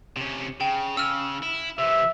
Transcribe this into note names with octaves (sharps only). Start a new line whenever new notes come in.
C3 C#4
C#3 G5
C#3 E6 F6
E4
C3 E3 E5